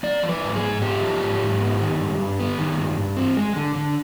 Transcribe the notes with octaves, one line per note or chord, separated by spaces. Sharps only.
B3 D5
F3
B4
G#2
G#4
G#2
B3 G4
F3
G#2
G#2
B3
D#3
G2
G2
B3
D#3
G2
G2
C4
G#3
D3
D3